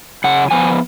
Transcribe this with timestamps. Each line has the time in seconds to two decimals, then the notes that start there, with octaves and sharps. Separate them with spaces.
0.24 C#3 F#5
0.51 F3 B3 G#5